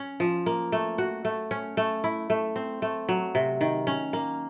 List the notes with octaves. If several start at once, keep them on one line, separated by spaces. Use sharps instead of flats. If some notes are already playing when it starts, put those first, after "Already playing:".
Already playing: C#4
F3
A#3
A3
F#4
A3
C#4
A3
E4
A3
C4
A3
F#3
C3
D#3
C#4
A#3